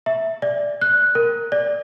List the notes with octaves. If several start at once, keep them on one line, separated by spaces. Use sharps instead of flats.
E5
D5
F#6
A#4
D5